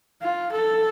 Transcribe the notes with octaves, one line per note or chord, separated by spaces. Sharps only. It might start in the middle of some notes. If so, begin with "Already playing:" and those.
F4
A4